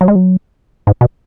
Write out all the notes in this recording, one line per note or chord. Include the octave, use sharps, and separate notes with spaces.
F#3
G#3
F#3
G#2
B2